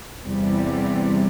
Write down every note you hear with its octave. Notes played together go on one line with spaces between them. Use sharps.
E2 C3 E3 G3